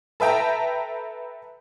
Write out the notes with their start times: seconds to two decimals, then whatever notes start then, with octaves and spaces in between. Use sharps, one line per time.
0.20 A4 B4 E5 G5 A5 A#5